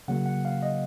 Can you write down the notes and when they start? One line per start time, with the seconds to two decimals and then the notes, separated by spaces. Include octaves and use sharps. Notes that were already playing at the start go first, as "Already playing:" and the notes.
0.08 C#3 F#3 A#3 F#5
0.26 F#5
0.45 F5
0.62 D#5